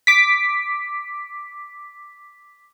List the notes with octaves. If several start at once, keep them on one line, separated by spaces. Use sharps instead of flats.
D6 B6